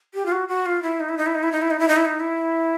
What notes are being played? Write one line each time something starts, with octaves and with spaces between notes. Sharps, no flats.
G4
F4
F#4
F#4
F4
E4
D#4
E4
D#4
E4
D#4
E4
D#4
E4
D#4
E4
D#4
E4
D#4
E4